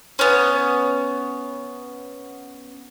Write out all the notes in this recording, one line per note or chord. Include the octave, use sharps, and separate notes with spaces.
B3 C#4